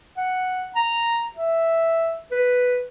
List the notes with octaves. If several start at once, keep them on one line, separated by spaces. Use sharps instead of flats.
F#5
A#5
E5
B4